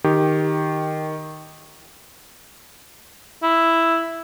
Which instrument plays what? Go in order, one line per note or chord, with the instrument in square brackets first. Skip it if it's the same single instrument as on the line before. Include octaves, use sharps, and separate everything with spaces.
[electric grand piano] D#3 G4
[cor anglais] E4